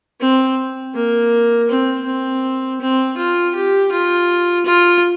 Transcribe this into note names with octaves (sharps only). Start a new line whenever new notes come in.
C4
A#3
C4
C4
C4
F4
G4
F4
F4